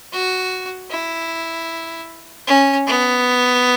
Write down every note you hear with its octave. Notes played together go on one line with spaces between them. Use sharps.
F#4
E4
C#4
B3